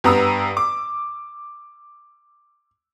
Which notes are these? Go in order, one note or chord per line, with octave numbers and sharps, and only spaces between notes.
G2 B3 A#5 D#6 E6
D6